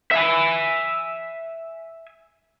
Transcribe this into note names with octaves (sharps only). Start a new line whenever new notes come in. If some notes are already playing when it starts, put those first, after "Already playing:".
E5 G#5